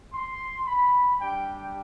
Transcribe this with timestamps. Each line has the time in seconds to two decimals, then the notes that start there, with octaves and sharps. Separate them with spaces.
0.13 C6
0.67 B5
1.20 G3 D4 G4 G5